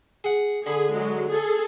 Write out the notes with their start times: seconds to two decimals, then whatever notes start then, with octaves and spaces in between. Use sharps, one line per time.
0.24 G#4 F#5
0.66 D3 G#4 B5
0.94 F#3 G#3
1.31 G#4 A4